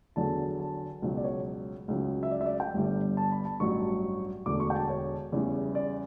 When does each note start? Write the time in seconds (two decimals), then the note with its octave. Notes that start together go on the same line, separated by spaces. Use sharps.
0.16 E2 D3 F#3 A5
0.60 A5
1.02 C#2 B2 F#3
1.17 D5
1.24 C#5
1.88 C#2 C#3 F#3
2.23 E5
2.31 D5
2.41 E5
2.46 D5
2.60 G5
2.74 G1 G2 D3 G3
3.17 A5
3.32 B5
3.45 A5
3.60 A1 G2 F#3 C#6
4.46 E1 D2 D3 D6
4.60 C#6
4.70 G5
4.75 A5
4.89 C#5
5.32 E2 C#3 E3 G3
5.75 D5